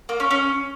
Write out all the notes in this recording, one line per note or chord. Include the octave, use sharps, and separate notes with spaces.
A#3
C#4
C#4